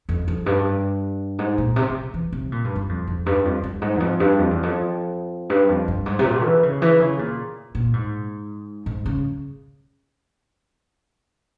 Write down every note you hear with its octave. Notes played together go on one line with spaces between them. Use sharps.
F2
F2
G2
G#2
A#2
C3
C3
E3
C3
A#2
G2
G2
F2
F2
G2
F2
G2
G#2
E2
F2
G2
F2
E2
F2
G2
F2
G2
G#2
C3
A#2
E3
C#3
E3
C#3
A#2
A#2
G#2
G#2
C#3